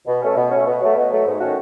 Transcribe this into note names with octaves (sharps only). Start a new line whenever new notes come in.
B2
A3 C#4
B2
A3 C#4
B2
F#3 A3
B2
F#3 A3
G#2
D#3 A3 C#4 F#4